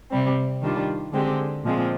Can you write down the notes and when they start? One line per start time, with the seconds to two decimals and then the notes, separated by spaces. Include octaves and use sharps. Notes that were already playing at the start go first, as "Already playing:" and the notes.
0.10 C3 G3 C4
0.62 D#3 G3 D4 F4
1.13 D3 G#3 C4 G4
1.63 A#2 F3 G#3 C4